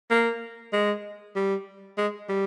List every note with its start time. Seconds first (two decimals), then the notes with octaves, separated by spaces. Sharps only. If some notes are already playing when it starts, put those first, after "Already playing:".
0.11 A#3
0.73 G#3
1.36 G3
1.98 G#3
2.29 G3